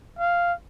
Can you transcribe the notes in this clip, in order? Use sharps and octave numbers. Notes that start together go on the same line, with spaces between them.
F5